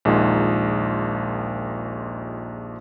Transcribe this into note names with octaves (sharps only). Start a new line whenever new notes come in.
A#1 D#2 G#3 D#4 F4